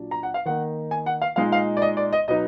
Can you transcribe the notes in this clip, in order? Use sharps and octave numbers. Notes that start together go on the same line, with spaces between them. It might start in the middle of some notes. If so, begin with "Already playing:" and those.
Already playing: A#2 F#3 D4
A#5
F#5
F5
D#3 A#3 D#4 F#5
G#5
F#5
F5
A#2 G#3 D#4 F5
F5
D5
D#5
D5
D#5
B2 F#3 B3 D#4 D#5